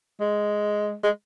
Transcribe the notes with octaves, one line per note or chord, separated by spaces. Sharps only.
G#3
G#3